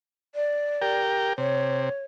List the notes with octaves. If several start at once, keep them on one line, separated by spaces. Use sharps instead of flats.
D5
G4 A#4 G5
C3 C#5